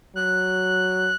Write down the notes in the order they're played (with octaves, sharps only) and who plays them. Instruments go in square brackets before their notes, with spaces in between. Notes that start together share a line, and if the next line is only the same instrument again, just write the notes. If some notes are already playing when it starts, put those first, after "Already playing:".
[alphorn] F#3 [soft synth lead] F#6